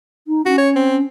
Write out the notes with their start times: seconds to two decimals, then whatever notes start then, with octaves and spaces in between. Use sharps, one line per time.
0.27 D#4
0.46 C#4 F#4
0.58 C#5
0.76 C4